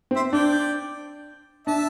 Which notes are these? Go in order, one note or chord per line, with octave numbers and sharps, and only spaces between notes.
C4
C5 E5
D4 D5 G5
D4 E5 A5